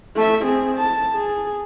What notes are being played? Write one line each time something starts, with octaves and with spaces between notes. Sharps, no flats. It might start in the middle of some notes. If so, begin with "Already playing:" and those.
A3 E5
C4 G#4
A5
G#4